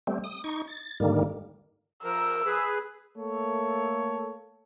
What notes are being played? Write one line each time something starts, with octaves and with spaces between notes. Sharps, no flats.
G3 A3 C4
D#6
D#4 C#6
A6
G#2 D3 D#3 G3 A#3
F3 A#4 E6
G#4 B4
A3 A#3 A4 C#5